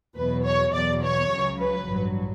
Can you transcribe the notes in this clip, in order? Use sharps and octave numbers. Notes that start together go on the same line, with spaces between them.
E2 B2 F#3 B4
C#5
E2 B2 F#3 D5
C#5
C#2 C#3 F#3
B4
A1 G2 F#3